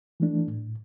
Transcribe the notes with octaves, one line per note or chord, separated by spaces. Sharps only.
E3 A3 D4
A2